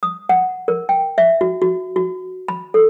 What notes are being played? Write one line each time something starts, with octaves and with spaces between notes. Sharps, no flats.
D#6
F#5
A#4
G5
E5
F#4
F#4
F#4
B5
A4